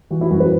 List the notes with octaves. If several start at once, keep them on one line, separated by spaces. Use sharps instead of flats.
E3 F#4
E4
F#2 F#4
B4